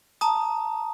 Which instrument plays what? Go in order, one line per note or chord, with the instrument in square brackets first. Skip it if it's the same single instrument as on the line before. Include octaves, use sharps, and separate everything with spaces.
[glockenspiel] A5 A#5 D#6